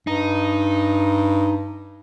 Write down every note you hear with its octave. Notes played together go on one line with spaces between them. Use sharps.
G2 D#4